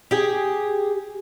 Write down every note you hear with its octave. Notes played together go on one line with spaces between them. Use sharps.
G4 G#4